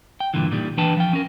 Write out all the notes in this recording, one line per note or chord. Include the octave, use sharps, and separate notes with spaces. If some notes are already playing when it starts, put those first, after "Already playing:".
G5
G2 A#2 D3 E3
A#2 D#3 G3
E3 D4 B4 G5 A5
F3 G5
C#4 A#4